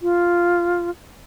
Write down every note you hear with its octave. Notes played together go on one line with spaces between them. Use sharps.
F4